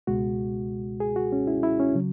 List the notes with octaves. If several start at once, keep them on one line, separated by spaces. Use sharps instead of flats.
C#2 B2 G#3 F#4
G#4
F#4
C#4
E4
E4
C#4
C#3 F#3